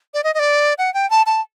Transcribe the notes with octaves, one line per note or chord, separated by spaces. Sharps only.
D5
D#5
D#5
D5
F#5
G5
A5
A5